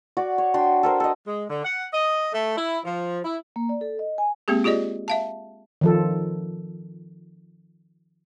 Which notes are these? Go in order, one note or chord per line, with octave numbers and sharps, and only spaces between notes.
F#4 D5
C#5
D4 F#4 G5 C6
A4 A#4 C5
A4 D#5
G#3
D3
F#5
D#5
A3
E4
F3
E4
A#3
D5
A4
D#5
G#5
G#3 A#3 C4 G4 G#4
F4 G4 G#4 D5 D#5
E5 F5 A5
D#3 F3 A4